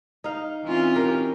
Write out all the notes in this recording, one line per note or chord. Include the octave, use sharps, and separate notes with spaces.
D#4 F5
E3 C4 C#4 F4
G4 A#4